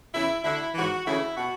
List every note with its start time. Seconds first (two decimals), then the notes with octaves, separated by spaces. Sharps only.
0.13 E2 C#3 E3 E4
0.43 D2 D3 E4
0.74 G#2 E3 F#4
1.05 D2 C#3 E3 E4
1.35 B2 F#4